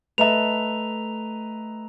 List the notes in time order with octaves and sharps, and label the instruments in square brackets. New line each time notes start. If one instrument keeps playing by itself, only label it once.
[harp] A3 A4 [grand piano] B4 D#5 E5 [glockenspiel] A#5 F7